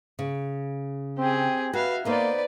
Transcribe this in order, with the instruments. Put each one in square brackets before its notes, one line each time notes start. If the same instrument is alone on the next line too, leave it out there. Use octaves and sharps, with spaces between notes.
[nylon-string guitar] C#3
[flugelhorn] C4 [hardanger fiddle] G4 G#4
[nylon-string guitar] F#4 [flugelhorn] B4 [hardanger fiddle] E5 F5
[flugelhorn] A#3 [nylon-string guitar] B3 D#4 C5 [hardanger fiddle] B4 D5